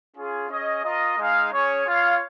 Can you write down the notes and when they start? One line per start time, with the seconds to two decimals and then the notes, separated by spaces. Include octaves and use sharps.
0.15 C#4 F4 G#4
0.49 C#4 G#4 D#5
0.84 F4 A#4 D#5
1.18 G#3 D#4 G#4 F5
1.52 C#4 G#4 C#5
1.87 F4 C#5 F5